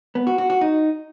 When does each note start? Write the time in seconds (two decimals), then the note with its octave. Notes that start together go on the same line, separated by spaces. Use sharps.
0.15 B3
0.27 F#4
0.38 F#4
0.50 F#4
0.61 D#4